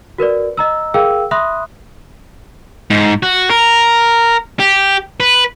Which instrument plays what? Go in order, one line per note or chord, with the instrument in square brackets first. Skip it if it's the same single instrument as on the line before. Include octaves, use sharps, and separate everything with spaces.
[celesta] F#4 A#4 B4 D5
D#5 A#5 E6
G#4 A#4 F5 G5 E6
E5 B5 C6 D#6 F#6
[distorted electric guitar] G#2
F#4
A#4
G4
B4